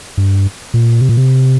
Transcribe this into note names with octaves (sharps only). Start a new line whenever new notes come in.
G2
A#2
C3
A#2
C3